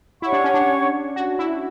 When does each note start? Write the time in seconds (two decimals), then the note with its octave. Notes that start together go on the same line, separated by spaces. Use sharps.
0.22 E4 G4 C#5 F#5 C#6
0.33 D4
0.44 C#4
0.54 D4
1.16 F#4
1.39 E4